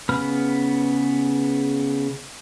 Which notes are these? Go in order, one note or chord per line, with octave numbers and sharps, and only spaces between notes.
C#3 B3 B4 B5 F6